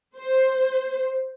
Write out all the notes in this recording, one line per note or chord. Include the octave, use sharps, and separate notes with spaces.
C5